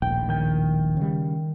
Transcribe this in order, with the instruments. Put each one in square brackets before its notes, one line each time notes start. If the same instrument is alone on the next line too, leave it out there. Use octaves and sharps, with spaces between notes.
[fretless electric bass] D#1 A#1 A2 [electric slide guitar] G5
[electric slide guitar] D#3 G5
[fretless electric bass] C#3 G3